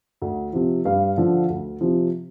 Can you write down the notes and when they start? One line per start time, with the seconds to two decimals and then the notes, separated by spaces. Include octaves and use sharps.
0.22 D2
0.53 C3 F3
0.85 G2 F5
1.17 D3 F3
1.49 D2
1.81 C3 F3